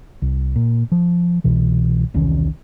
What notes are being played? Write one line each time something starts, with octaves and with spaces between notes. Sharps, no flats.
C2
A#2
F3
C2 B2 E3
E1 C2 D#3 C#4